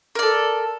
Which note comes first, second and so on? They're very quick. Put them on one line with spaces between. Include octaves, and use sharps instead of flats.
A#4 D5 A4